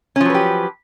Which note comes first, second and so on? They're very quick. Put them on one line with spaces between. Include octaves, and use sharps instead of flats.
C#4 F3 F#3 B4 G4